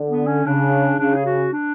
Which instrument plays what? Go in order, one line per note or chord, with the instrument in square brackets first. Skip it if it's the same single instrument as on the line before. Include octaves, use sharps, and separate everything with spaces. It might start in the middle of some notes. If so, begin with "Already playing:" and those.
Already playing: [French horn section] D3
[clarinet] B3
C#4
[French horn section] C#3 [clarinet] D4
[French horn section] C#3 [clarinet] D4
[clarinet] G#4
F#4
D4